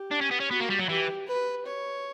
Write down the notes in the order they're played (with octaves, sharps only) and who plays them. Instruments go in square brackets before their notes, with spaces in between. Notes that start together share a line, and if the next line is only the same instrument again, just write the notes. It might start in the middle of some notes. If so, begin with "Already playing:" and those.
Already playing: [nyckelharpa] G4
[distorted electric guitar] D4
C#4
B3
C#4
[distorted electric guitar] B3 [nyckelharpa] F#4
[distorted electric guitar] A#3
G3
F#3
[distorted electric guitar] E3 [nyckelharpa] G4
[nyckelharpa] B4
C#5